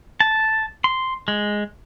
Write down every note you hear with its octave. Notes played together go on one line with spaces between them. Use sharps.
A5
C6
G#3